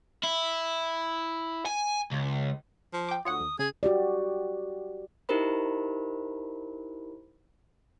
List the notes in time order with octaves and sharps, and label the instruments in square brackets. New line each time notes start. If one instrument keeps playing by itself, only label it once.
[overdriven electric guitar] E4
G#5
C#2
[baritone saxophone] F3
[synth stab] G5 D6
[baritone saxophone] D2 [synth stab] F4 C#5 F#5 [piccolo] D#6
[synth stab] D#2
[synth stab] C#3 [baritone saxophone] G#4 [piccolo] G#6
[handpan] F#4 G4 D5
[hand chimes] D#4 E4 G4 A#4 C5 B5